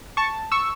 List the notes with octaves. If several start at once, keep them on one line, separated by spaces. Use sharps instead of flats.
A5 C#6
C#6 E6